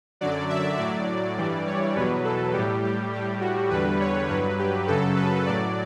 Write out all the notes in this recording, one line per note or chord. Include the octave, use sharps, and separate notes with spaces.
F#2 D3 F#3 D5
E5
A2 F#3 D5
G2 E3 G3
C#5
E2 B2 F#3 B4
A4
A2 G3 G4
G4
A2 G3 G4
F#4
E2 D3 G3 B4
C#5
G2 F#3 B4
G4
F#2 C#3 F#3 A4
B4
A2 F#3 D5